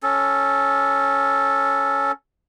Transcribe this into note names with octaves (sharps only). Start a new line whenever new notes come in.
C#4 A4